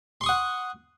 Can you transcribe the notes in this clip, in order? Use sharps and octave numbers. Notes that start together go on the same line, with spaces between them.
F#5 C6 C#6 D#6